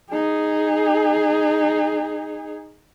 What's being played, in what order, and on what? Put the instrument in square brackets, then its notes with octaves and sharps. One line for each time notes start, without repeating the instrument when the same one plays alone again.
[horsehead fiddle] D#4 G#4